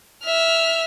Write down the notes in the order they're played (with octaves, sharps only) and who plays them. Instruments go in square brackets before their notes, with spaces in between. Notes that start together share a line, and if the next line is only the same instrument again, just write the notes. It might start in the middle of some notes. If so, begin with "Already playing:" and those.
[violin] E5 F6